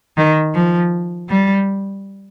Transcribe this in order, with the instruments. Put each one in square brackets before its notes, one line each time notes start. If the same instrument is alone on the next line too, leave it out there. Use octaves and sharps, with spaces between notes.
[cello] D#3
F3
G3